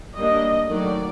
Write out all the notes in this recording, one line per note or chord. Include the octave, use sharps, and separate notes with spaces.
G3 A#3 D4 D#5
D#3 F#3 A3 D5